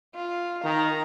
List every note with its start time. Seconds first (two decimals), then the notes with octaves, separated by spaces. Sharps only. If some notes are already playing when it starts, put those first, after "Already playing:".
0.15 F4
0.64 D#3 A#5